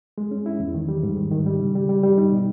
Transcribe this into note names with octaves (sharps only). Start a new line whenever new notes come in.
G#3
C#4
E4
E2
D#3
G3
G#2
D#3
D#3
G3
C#3
G3
G3
G3
D#4
B2